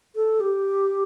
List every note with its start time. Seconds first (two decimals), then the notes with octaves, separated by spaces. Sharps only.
0.16 A4
0.40 G4